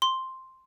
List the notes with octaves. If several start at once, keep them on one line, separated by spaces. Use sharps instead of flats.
C6